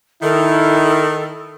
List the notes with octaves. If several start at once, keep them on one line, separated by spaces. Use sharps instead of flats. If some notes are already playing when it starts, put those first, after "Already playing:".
D#3 E4 A4